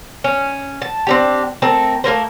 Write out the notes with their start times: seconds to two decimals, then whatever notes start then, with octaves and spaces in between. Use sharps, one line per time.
0.24 C#4
0.82 A5
1.07 C4 D4 G4
1.62 A3 C4 A#4 A5
2.04 A3 A#3 A#4 C5